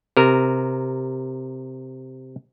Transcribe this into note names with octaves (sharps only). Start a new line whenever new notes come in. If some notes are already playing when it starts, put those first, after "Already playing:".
C3 A#4